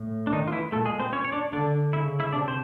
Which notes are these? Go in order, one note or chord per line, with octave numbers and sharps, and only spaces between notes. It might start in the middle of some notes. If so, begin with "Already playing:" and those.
Already playing: A2
D4
D#3 D#4
F4
E3 E4
A#2 A3 A4
G#3 G#4
C4 C5
C#4 C#5
C#5
D4 D5
D3 D4 D5
C#3 E4 E5
E4 E5
C3 D4 D5
C5